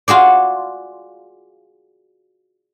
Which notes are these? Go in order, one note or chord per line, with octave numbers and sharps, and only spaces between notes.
F4 F#4 G#4 D5